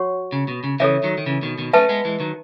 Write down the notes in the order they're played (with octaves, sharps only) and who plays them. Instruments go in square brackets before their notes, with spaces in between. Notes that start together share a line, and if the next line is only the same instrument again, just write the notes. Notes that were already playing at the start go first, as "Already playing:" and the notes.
Already playing: [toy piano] F#4 C#5 F#5 C#6
[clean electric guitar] C#3
B2
C#3
[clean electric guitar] C#3 E3 [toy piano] A4 C#5 E5
[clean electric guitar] D#3 F#3
D#3
C#3 E3
B2 D#3
B2 D#3
[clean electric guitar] A3 C#4 [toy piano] B4 E5 A5
[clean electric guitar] G#3 B3
E3 G#3
D#3 F#3